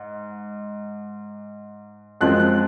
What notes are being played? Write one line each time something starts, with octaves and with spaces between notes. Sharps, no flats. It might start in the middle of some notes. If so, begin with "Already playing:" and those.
Already playing: G#2
F#2 F3 G#3 C4 F4 F#6
F#6